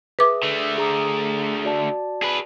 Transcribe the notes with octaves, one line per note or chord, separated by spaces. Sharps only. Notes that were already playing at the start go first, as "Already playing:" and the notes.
G#4 B4 E5 D6 D#6
D3 A3
G#4 A#5 D#6
F#4 D5 A5
G#4 B4